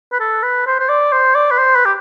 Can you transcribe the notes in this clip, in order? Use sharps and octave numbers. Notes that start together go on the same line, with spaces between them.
B4
A4
B4
C5
C5
D5
C5
D5
B4
C5
B4
G4